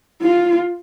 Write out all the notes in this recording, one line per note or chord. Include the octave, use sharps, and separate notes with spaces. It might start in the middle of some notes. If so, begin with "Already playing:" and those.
F4